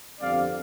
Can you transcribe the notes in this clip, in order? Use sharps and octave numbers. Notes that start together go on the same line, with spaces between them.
G1 F2 D3 G3 C4 D5 F5